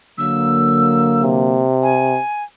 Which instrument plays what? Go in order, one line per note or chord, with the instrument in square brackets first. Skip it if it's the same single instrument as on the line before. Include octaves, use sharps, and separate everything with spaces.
[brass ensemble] D3 F#3 A#3 [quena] E6
[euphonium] C3
[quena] G#5